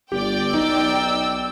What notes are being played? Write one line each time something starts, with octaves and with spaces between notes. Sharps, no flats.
G1 G4 D5 G5
B1 D#4 E6